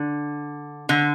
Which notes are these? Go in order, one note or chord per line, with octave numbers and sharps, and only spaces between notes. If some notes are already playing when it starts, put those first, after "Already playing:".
Already playing: D3
D3